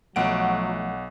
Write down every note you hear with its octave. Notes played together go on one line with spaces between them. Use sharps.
B1 F3 F#3 A3 F#5 D7